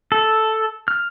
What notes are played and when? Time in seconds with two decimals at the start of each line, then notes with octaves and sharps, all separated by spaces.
0.12 A4
0.88 F6